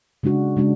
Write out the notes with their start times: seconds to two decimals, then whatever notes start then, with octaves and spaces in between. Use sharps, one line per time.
0.23 C#3 G#3 D4 F#4
0.57 C#3 G#3 D4 F#4